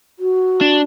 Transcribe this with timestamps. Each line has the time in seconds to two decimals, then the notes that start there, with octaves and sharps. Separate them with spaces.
0.19 F#4
0.61 D4